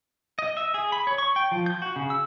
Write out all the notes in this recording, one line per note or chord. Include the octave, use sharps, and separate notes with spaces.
D#5
E5
G#4
B5
C#5
C#6
G5
F3
G6
F#4
C#3
E6